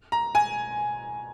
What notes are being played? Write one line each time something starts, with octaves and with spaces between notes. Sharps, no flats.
A#5
G#5